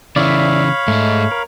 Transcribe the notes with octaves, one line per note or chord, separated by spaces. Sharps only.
C#3 E3 C#5 D5 E5 F5 B5
G#2 G#3 A3
A#4